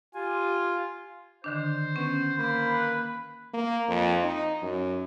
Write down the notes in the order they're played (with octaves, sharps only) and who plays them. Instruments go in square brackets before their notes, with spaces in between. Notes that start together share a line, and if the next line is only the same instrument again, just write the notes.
[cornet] F4 [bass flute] G4 [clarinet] G#5
[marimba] D3 D#3 D4 [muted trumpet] C5
[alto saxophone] B3 [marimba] C#4
[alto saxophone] A#3 [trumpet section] B5
[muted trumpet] B4
[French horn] A#3
F2
D#4
F#2